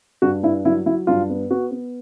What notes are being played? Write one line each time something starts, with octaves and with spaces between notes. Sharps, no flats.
G2 F#4
G2 E4
F#3 E4
F#3 E4
G2 F4
B3
B3 F#4
B3